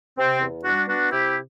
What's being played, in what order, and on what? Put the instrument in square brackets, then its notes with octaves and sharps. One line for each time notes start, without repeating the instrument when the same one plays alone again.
[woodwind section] C3 C4
E2
G3 D4 F#4
B3 D4 F#4
C3 E4 G4